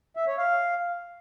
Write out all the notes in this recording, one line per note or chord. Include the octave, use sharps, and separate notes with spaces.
E5
C#5
F5